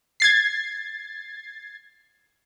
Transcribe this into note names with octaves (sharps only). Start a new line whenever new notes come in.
G#6 A6 C7